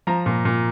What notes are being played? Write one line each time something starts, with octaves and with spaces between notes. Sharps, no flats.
F3 A#5
A#2
A#2